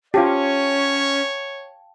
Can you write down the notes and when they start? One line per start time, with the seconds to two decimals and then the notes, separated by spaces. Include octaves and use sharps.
0.14 C#4 F4 G4 C#5 F5 G5 A5